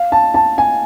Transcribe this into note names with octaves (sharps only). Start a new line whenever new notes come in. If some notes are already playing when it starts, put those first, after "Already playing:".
Already playing: F5
A5
A5
G#5